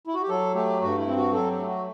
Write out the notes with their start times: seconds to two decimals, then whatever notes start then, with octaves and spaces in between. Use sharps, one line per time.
0.07 E4
0.15 F#4
0.22 G4
0.29 F#3 A4
0.55 A3 G4
0.81 G2 F#4
0.98 E4
1.07 C4
1.16 F#4
1.33 F#3 A4
1.51 G4
1.59 A3
1.68 F#4